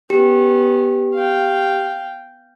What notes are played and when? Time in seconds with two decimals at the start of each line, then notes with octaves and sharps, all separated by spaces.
0.10 B3 C#4 G4
1.14 F5 G5